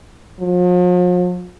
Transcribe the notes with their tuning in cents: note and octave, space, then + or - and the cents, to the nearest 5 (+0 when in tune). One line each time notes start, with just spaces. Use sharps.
F3 +45